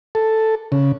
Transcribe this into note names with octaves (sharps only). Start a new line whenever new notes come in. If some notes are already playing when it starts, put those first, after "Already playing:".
A4
C#3